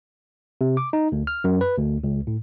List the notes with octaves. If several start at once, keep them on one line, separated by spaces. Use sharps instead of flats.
C3
D6
D#4
D2
F6
F#2
B4
D2
C#2
A2